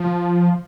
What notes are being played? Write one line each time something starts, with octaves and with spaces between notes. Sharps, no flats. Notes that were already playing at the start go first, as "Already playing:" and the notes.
Already playing: F3